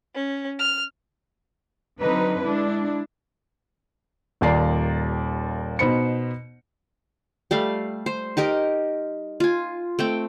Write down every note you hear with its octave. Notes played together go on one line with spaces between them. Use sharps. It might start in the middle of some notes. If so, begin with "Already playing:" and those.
C#4
F6
D3 F#3 C4 D#4 B4
G#3 D4 E4
D#1 D#2 F4 D5 A#5 C7
B2 D#4 C5 B5 C#7
G3 A3 F5
C5
D#4 G4 A#4 D#5
F4 G#5
A3 C4 G5